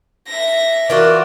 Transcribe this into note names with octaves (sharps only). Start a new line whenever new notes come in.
E5 A#6
E3 F4 F#4 A#4 D5